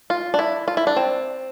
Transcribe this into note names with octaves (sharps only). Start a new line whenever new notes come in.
F4
D4
E4
F4
E4
D4
C4